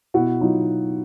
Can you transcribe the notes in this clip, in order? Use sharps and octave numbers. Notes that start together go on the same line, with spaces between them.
B2 E4 F#4
F#3 D#4 F4